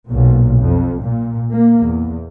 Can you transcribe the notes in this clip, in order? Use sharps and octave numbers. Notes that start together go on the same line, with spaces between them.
B1 A#2
F2
A#2
A#3
E2